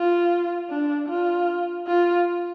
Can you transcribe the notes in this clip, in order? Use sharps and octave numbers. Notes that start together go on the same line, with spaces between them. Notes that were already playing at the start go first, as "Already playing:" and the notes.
Already playing: F4
D4
F4
F4